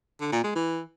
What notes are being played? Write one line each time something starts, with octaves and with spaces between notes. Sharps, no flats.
D3
A#2
G#3
E3